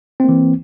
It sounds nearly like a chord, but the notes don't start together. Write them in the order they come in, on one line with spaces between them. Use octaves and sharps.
C4 A#3 E3